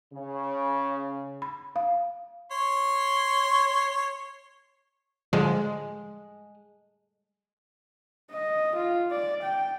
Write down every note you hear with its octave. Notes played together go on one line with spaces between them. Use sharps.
C#3
B5
F5
C#5 C6
D3 F3 G#3
D#5
F4
D5
G5